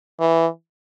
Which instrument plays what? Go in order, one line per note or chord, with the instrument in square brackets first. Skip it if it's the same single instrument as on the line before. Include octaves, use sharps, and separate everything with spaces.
[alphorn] E3